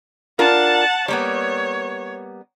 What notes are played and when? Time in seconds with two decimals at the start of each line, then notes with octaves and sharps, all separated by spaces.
0.39 D4 F4 A#4 F#5 A5
1.08 G3 A#3 B3 C#5